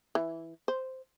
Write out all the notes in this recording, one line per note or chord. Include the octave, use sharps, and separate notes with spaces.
E3
C5